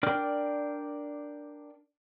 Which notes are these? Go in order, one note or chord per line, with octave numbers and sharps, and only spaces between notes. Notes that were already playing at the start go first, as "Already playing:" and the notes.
D4 A#4 D5 G5 F6